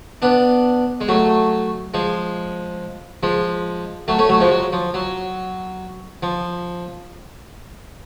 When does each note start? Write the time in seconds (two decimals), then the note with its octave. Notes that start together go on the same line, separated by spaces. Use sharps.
0.22 B3 D4
1.01 G#3
1.08 F#3 A3
1.94 F3 G#3
3.23 F3 G#3
4.08 F#3 A3
4.19 A3 C#4
4.29 F#3 A3
4.40 F3 G#3
4.51 F#3
4.73 F3
4.94 F#3
6.23 F3